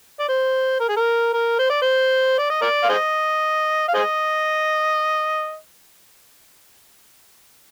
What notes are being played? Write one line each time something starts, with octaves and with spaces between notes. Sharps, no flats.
D5
C5
A#4
G#4
A#4
A#4
C5
D5
C5
D5
D#5
A#4 D5
F5
G#4 C5 D#5
F5
G#4 C5 D#5